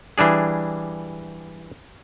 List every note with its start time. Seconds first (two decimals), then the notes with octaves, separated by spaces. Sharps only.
0.18 E3 G3 D4 G#4